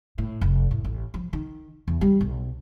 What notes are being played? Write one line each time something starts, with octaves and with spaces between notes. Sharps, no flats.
A2
F1
A2
A1
F3
D#3
E2
G3
B1